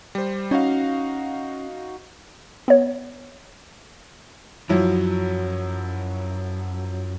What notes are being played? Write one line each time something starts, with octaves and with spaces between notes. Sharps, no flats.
G3 C5
C#4 D#4 F#4 F5
B3 C#5
F#2 F3 F#3 E4